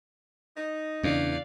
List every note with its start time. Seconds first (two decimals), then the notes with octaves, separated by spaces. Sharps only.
0.57 D#4
1.03 E2 C#3 C#4 D4 D5 F5